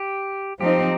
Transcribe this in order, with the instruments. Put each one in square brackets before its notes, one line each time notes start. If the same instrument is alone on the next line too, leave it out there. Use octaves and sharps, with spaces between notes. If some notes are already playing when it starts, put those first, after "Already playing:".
Already playing: [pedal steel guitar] G4
[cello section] F3 C4 D#4 [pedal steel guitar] G4